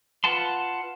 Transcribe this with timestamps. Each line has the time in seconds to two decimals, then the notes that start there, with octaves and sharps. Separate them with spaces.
0.24 F4 B4 F#5 A5 C6